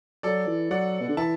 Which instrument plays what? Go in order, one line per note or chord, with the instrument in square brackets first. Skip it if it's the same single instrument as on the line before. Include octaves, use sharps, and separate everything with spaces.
[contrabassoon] F#3 [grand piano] A4 D5
[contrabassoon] E3
[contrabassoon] F#3 [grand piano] D5 F#5
[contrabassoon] B2
D3
[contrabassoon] E3 [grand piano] E5 A5